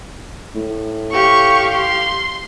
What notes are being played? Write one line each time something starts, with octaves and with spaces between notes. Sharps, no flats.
A2
G4 F5 C#6
C6